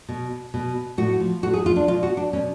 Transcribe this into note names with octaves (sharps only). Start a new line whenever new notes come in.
B2
B2
A2 F#4
F3
A2 F#4
G#4
F3 F4
D4
B2 F4
F#4
D4
B2 C#4